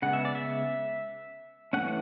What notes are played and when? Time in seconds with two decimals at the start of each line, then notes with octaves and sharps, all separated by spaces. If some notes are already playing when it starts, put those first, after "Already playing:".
0.02 C#3 G#3 B3 F#5
0.13 E5
0.25 D5
0.35 E5
1.73 E3 A3 C#4 F#5